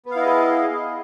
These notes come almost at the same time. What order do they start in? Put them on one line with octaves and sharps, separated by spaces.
B3 F5 E4 D#5 G#4